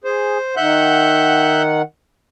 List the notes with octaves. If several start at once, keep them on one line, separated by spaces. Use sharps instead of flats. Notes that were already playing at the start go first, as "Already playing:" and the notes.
G#4 C5
D#3 E5 F#5 F#6 G6